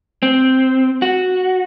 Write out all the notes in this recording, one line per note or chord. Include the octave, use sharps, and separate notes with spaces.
C4
F#4